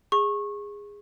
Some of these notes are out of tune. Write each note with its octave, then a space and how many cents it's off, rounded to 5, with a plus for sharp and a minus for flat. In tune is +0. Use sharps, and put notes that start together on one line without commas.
G#4 -15 C#6 -20